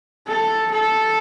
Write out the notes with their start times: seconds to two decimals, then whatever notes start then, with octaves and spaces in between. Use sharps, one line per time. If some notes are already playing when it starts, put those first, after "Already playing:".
0.28 A4
0.72 A4